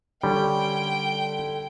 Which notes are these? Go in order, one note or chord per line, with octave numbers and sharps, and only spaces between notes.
D3 G3 C#4 G5